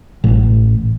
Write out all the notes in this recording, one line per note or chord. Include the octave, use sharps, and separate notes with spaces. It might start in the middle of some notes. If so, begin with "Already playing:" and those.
A1